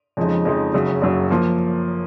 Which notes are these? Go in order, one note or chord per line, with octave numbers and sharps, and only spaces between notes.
F2 C#3 F3 G#3 D#4
F2 C#3 F3 G#3 D#4
F#1 F#2 C#3 F#3
F#1 F#2 C#3 F#3
F3 A#3